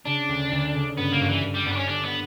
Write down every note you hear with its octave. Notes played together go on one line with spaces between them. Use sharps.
C#3 D4
D2
D2
C#3
G2 B3
A#3
G2 F#3
E3
G2
G3
G2 B3
D4
C#4
G1 D4
B3